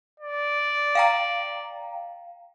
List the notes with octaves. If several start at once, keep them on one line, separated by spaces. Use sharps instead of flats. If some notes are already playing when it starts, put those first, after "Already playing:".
D5
F5 G5 A#5